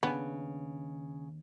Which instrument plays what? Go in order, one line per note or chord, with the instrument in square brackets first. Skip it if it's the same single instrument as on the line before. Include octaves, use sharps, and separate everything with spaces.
[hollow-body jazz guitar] D#2 D4 G#5 [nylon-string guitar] C#3 [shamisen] B3